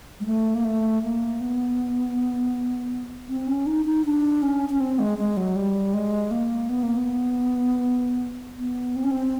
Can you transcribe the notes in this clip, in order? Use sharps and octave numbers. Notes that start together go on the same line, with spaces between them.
G#3
A3
A#3
A3
A#3
B3
C4
C#4
D#4
D#4
D4
C#4
C#4
C4
G#3
G#3
F#3
G3
G#3
A#3
B3
A#3
B3
B3
C4
C#4
C4